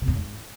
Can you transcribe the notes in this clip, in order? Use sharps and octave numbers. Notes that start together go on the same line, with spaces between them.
C3
F#2
G#2